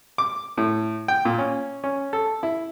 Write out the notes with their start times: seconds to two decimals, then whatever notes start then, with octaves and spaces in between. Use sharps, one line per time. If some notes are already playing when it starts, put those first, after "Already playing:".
0.18 D6
0.58 A2
1.08 G5
1.25 A#2
1.38 C#4
1.84 C#4
2.13 A4
2.43 E4